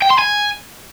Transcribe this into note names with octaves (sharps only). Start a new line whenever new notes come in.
G5
C6
G#5